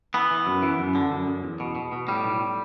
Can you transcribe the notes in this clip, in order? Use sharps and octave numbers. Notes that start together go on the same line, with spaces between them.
E3 B3
E3
F#2
E3
F#2
D3
F#2
F#2
E2
B2
B2
B2
A2 G3
B1